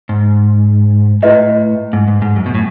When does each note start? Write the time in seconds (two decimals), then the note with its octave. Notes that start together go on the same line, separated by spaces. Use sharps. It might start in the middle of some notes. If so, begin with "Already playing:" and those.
0.09 G#2
1.22 A2 E4 B4 D#5
1.93 G#2
2.08 G#2
2.22 G#2
2.36 F#2
2.46 B2
2.55 A2